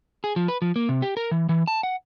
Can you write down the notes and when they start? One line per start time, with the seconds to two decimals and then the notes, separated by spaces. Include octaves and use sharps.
0.24 G#4
0.36 F3
0.48 B4
0.62 F3
0.76 A#3
0.89 C3
1.02 G4
1.17 A#4
1.31 E3
1.49 E3
1.68 A5
1.83 F#5